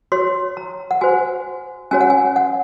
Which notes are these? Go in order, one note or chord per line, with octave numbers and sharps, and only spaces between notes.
F#4 C#5 C6
A#5
F#5
F#4 C5 G#5
C#4 F#4 C#5 G#5
F#5
G#5
F#5